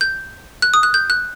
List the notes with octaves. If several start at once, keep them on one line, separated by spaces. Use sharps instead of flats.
G6
F#6
D#6
F#6
G6
F#6